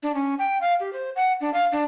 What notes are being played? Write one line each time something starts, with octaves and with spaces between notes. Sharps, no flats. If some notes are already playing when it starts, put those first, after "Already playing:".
D4
C#4
G5
F5
G4
C5
F#5
D4
F5
D4